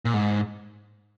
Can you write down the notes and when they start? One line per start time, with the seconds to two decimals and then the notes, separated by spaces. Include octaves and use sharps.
0.05 A#2
0.14 G#2